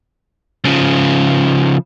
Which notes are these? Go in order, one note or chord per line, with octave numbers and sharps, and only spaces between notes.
C#3 F3